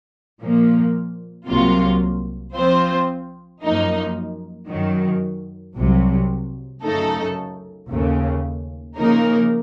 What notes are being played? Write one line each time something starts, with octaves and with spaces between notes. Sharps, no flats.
A#2 F3 A#3
C2 C3 F#3 A#3 F4
F3 C4 F4 C5
F#2 F3 A#3 D#4
F#2 D#3 F#3
C2 C3 F#3
F#2 C#3 A3 D#4 A4
D#2 C#3 A3
C#3 F3 A#3 D#4 A#4